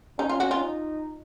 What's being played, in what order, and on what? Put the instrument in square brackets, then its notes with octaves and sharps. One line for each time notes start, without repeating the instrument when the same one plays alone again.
[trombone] C#4 [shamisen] D#4
[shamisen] F4
F#4
F4
[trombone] D#4